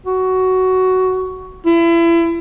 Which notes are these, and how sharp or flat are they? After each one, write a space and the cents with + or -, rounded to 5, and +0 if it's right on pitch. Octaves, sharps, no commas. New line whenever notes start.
F#4 +10
E4 +35